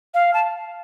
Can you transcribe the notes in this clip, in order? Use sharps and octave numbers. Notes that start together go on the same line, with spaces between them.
F5
A5